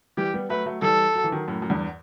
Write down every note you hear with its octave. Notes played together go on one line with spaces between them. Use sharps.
E3 G3 G4
G3 B3
F#3 A3 B4
F#3 A3
E3 G3 A4
F#3
E3
D#3 F#3
F#2 A2
F#2
E2 G2